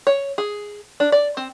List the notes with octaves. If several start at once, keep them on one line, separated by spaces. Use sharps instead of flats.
C#5
G#4
D4
D5
C4